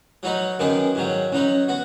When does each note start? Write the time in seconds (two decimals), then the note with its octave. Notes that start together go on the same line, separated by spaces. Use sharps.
0.23 F#3 D#4 F#4 B4
0.59 F#2 D#3 B3 C#4 G#4 B4
0.95 G#2 D#3 F#3
1.32 F#3 C#4 D#4 B4
1.68 B3 F#4